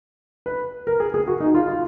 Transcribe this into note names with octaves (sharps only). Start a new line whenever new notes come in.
B4
A#4
G#4
G#4
F#4
D#4
F4
F4